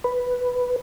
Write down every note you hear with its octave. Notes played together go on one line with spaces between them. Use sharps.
B4